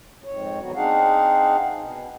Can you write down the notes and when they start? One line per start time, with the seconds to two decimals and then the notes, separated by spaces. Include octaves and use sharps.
0.24 F2 G#2 C#5
0.60 E2 D3 F#3 B3 F#4
0.75 C4 D4 D#4 G#4 F5 F#5
1.75 B2